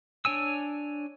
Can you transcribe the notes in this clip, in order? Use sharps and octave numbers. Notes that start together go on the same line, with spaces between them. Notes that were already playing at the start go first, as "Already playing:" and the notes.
D4 C#5 G#5 E6